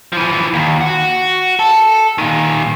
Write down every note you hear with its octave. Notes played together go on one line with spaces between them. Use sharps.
E3 F3
D#2
F#4
A4
A#2 D#3